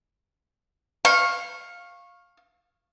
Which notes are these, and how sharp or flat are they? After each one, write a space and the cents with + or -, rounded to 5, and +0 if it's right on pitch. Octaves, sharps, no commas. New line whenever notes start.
F5 +10 C#6 -20